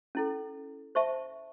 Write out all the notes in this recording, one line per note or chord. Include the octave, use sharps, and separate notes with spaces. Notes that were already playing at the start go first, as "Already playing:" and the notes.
C#4 E4 A4
C5 E5 A5 C#6